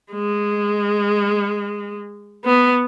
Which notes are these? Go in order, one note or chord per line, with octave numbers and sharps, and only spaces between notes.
G#3
B3